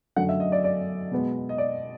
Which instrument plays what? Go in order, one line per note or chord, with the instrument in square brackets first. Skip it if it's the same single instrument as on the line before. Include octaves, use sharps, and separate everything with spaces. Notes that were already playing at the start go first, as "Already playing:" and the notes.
[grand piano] F#2 D3 F#3 A3 F#5
E5
D#5
D5
D5
B2 G#3 B3
D#5
D5